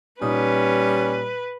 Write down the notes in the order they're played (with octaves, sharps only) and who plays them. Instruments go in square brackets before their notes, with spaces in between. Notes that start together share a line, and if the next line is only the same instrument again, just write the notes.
[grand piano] A#2 D#4 D#6 [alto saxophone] G3 [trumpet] C#4 [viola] B4